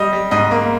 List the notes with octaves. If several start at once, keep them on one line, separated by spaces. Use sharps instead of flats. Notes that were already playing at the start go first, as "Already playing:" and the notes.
Already playing: G3 D#5
G3
G#2 D#5
A#3